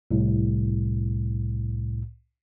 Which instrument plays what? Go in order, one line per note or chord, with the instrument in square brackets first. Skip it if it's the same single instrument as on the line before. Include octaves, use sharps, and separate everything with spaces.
[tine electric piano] C2 A2